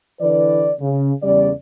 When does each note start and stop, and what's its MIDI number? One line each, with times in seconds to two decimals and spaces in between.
0.21 0.72 50
0.21 0.72 52
0.21 0.72 71
0.21 0.72 74
0.81 1.13 49
1.23 1.51 40
1.23 1.51 49
1.23 1.51 55
1.23 1.51 74